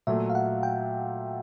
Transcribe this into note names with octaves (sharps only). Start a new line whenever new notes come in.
A#2 F#3 A3 E5
F5
F#5
G5